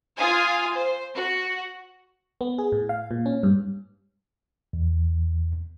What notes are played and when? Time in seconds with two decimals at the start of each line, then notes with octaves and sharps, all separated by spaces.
0.18 F4 F5 G#5 D#6
0.74 C5
1.13 F#4
2.41 B3
2.58 G#4
2.72 A2
2.89 F5
3.11 A#2
3.26 C#4
3.43 G2
4.73 E2